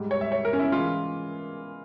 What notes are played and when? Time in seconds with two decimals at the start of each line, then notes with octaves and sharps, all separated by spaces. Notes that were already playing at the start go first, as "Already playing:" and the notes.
Already playing: G#2 G3
0.11 C#5
0.21 E5
0.32 C#5
0.45 A#4
0.53 C#4
0.59 E4
0.72 E3 G#3 F4